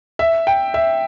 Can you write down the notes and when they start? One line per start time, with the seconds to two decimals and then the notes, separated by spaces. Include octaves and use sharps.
0.19 E5
0.47 G5
0.74 E5